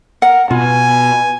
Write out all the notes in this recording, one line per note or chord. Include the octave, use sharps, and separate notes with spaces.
A#4 F#5
B2 B3 F4 G#5